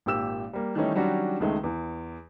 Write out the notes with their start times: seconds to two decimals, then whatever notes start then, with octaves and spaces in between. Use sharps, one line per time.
0.06 G#1 A#2 G4 E6 E7
0.53 G3 A#3
0.75 D#3 E3 G3 A3 C#4 D#4
0.95 D#3 F#3 G3 C#4 D4 F#4
1.40 C#2 D#3 G#3 A3
1.64 E2